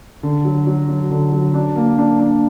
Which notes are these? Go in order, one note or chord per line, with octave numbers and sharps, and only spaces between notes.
D3
F#3
F#3
F#3
D3
F#3
D4
A#3
D4
D4